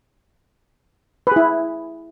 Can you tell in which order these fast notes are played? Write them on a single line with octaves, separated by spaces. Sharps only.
B4 G#4 E4